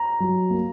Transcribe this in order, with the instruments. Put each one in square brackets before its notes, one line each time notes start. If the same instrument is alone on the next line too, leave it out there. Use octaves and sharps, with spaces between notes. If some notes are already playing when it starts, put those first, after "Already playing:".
Already playing: [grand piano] A#5
[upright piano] F#3
A#3